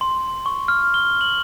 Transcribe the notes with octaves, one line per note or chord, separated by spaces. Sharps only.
C6
C#6
F6
G7
F#7